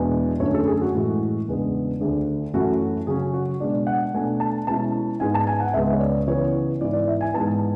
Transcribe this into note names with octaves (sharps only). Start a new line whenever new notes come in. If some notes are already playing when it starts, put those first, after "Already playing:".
Already playing: E2 B2 G#3 B3 D4
F#2 D3 A3 C#4 C#5
A4
G#4
F#4
A2 E3 G#3
E2 C#3 G#3 B3 D4
D2 D3 A3 D4 G#4
F#2 E3 A3 C#4 E4 F#4
C#3 F#3 C#4 G#4
F#4
B2 G#3 D4 D5
F#5
B2 A3 D4 G#5
A5
B2 G#3 C#4 E4 A5
G#2 G#3 B3 G#5
A5
G#5
F#5
C#2 C#3 G#3 B3 E5
C#5
D5
C#3 E3 B3 C#5
G#2 E3 B3 E4 D5
D5
E5
G#5
G#2 E3 B3 A5